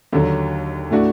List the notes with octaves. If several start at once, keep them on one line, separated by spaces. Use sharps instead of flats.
D#2 D3 F#3
A2 A3 D4 F#4